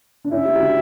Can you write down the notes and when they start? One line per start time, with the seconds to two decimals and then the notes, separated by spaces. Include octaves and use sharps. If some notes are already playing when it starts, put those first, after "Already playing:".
0.24 D4
0.31 C#4 E4 E5
0.45 E4 G4
0.55 G4
0.59 D4 F#4